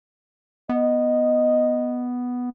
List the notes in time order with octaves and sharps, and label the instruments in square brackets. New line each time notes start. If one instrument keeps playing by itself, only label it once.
[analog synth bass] B3 [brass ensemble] D#5